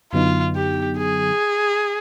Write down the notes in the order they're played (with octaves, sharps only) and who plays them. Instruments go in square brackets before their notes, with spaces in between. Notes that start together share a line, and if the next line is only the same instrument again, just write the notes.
[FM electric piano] F#2 D3 F#3 B3 D#4 [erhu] F4
[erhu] G4
G#4